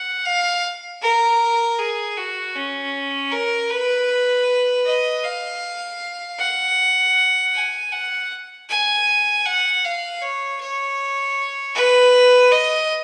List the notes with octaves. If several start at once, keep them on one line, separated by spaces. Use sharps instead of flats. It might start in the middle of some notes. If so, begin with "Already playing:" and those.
Already playing: F#5
F5
A#4
G#4
F#4
C#4
A#4
B4
D#5
F5
F#5
G#5
F#5
G#5
F#5
F5
C#5
C#5
B4
D#5